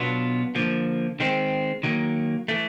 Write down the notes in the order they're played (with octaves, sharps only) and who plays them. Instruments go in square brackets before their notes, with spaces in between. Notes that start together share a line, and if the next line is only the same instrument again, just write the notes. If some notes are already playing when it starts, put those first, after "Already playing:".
Already playing: [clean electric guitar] B2 F#3 B3 D4 F4
D3 F3 A#3
D#3 G#3 C4
D#3 F#3 A#3
E3 A3